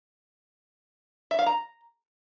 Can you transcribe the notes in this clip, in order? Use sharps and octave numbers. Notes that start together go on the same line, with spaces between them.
E5
F5
A#5